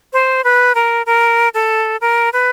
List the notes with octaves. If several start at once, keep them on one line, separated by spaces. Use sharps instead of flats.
C5
B4
A#4
A#4
A4
A#4
B4